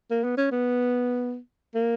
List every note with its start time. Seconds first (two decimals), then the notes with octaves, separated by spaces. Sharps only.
0.11 A#3
0.24 B3
0.37 C#4
0.51 B3
1.74 A#3